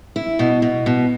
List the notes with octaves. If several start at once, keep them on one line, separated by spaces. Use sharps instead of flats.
E4
B2
B2
B2